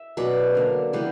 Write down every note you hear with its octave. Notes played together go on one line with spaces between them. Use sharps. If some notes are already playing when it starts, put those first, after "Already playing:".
Already playing: E5
B2 F#3 C#4 B4 D5
D3 A#3 D4
C#3 E3 G3 B3 G4 B4